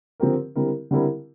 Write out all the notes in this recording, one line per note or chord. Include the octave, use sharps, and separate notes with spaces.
D3 F3 C4 G4 A#4
D3 G3 C4 E4 A#4
D3 G3 C4 E4 A#4